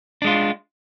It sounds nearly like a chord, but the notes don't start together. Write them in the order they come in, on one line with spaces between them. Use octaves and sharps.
D4 G#3 F4